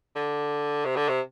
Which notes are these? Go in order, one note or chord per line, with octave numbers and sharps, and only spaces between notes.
D3
C3
D3
C3